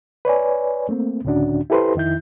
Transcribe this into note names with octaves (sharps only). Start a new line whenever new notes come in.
B4 C#5 D5 G#5
A3 A#3 C4
C#2 A2 D3 C#4 D4 F#4
E4 G4 A4 B4 C5 C6
F2 D#3 E4 G6